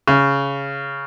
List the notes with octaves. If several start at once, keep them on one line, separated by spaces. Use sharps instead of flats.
C#3